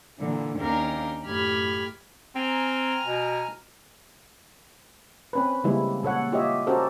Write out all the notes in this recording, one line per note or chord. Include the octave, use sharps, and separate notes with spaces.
A#2 D3 E3
D#2 C#4 D4 A#4 F5 G5
F#2 A2 G4 B5 F6 G#6
C4 G#5 A#5 F6
B2
C4 C#4 B4
C#3 E3 G3 G#3 A#3 E4
A#2 A4 C#5 F#5
F4 G4 C#5 D#5 E5
C#4 F#4 G4 A4 A#4 C5